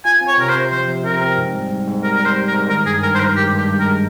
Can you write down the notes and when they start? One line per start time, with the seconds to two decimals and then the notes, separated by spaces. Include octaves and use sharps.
0.05 F4 G#5
0.21 C4
0.27 C#5
0.38 C3 A#4
0.49 C5
0.54 C3
0.71 F3 C5
0.88 C3
1.04 C3 A#4
1.21 C4
1.37 G#2
1.54 G3
1.70 G#2
1.87 G#2
2.03 G3 A#4
2.15 G3 A#4
2.25 C5
2.36 G3
2.47 A#4
2.54 G#2
2.70 D#3 A#4
2.86 G2 G#4
3.03 G2 A#4
3.15 C5
3.19 D#3 A#4
3.36 G#3 G4
3.53 G2 G4
3.68 G2
3.80 A#4
3.85 G#3